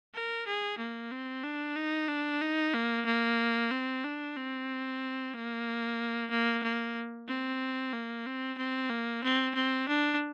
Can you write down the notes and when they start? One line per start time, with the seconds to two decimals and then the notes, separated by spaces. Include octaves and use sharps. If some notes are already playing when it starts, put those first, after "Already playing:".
0.14 A#4
0.47 G#4
0.78 A#3
1.12 C4
1.43 D4
1.76 D#4
2.08 D4
2.41 D#4
2.74 A#3
3.06 A#3
3.71 C4
4.04 D4
4.36 C4
5.34 A#3
6.30 A#3
6.63 A#3
7.28 C4
7.93 A#3
8.26 C4
8.58 C4
8.90 A#3
9.24 C4
9.55 C4
9.89 D4